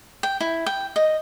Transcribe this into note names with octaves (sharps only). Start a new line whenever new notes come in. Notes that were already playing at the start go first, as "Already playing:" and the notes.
G5
E4
G5
D#5